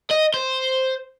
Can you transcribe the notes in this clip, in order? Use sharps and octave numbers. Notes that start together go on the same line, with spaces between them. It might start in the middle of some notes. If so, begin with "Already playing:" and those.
D#5
C5